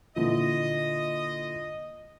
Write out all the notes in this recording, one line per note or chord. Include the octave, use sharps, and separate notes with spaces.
A#2 D3 E3 F4 D#5